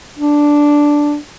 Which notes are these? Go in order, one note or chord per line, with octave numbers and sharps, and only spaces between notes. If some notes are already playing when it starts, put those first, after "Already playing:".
D4